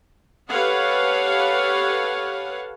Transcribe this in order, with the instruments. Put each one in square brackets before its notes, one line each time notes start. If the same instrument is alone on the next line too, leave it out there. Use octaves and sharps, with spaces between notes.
[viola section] G4 A4 B4 C#5 F5 F#5